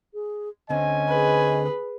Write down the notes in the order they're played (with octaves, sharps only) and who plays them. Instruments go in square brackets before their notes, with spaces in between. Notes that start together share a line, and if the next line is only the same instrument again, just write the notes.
[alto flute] G#4
[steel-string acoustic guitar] D2 D3 C4 [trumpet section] C#4 G#5 [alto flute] D#5
[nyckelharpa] G#4 B4